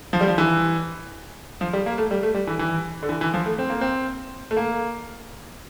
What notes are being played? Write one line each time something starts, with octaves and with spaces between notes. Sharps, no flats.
F3
G3
F3
E3
F3
G3
A#3
A3
G3
A3
G3
E3
E3
D3
E3
E3
F3
A3
C4
A#3
C4
A3
A#3